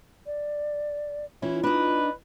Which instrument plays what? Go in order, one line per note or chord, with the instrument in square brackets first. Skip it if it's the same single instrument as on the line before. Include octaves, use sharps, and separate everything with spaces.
[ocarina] D5
[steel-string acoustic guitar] E3 C#4 E4 [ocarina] F4
[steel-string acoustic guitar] D4 D#4 [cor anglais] B4